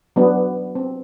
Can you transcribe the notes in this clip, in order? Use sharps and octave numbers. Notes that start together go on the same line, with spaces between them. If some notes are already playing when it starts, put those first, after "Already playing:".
F#3 B3 D4
C4